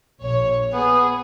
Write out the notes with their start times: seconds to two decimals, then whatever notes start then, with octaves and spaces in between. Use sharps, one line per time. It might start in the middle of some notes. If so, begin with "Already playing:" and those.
0.22 A#1 C#5
0.73 B3 G#4